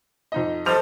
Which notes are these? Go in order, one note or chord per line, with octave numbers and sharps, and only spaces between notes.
F2 D#4 D#5
F3 G3 A4 C5 D#5 F7